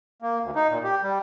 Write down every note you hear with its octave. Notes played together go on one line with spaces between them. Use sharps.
A#3
D2
D#4
A#2
G4
G3